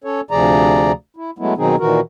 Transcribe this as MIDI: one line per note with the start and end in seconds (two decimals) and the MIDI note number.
0.04 0.21 61
0.04 0.21 69
0.04 0.21 73
0.31 0.92 38
0.31 0.92 48
0.31 0.92 53
0.31 0.92 68
0.31 0.92 74
0.31 0.92 82
1.17 1.31 64
1.38 1.54 54
1.38 1.54 56
1.38 1.54 57
1.38 1.54 59
1.38 1.54 64
1.57 1.76 47
1.57 1.76 51
1.57 1.76 54
1.57 1.76 60
1.57 1.76 63
1.57 1.76 68
1.79 2.00 46
1.79 2.00 51
1.79 2.00 52
1.79 2.00 66
1.79 2.00 70